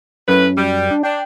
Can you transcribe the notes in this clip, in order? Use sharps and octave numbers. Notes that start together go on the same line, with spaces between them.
F#2 A2 B4
G3
D4
D4 G5